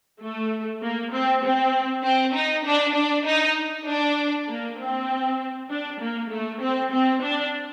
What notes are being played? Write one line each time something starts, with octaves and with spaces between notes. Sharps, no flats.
A3
A#3
C4
C4
C4
D#4
D4
D4
D#4
D4
A#3
C4
D4
A#3
A3
C4
C4
D4